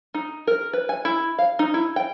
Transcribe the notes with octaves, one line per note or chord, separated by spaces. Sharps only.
D#4
A#4
B4
G#5
E4
F5
D#4
E4
G5